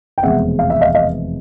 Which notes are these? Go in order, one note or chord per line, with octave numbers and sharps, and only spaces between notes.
G5
F1 E2 B2 G#3 C4 E5 F#5
F5
E5
D#5 F5
D#5 F5